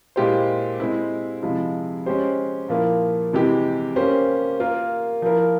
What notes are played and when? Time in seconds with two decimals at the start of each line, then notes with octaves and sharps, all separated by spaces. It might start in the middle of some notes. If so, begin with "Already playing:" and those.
0.16 A#2 G#3 E4 G4 C5
0.80 G#3 C4 E4
1.43 C3 F3 G#3 E4
2.06 G#3 C#4 G4 C5
2.69 A#2 F3 A#3 E4
3.33 C3 E3 G#3 E4 G4
3.96 A#3 C#4 G4 C5
4.60 A#3 F4 A#4
5.22 F3 A#3 E4 A#4